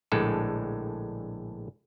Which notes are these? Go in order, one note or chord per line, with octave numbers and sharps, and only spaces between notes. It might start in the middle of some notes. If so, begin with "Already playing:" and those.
A#1 A2 D3 G#3 A4